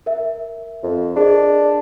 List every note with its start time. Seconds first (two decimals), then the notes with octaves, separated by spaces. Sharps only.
0.06 A#4 E5
0.83 F2
1.16 D4 G#4 A#4 D#5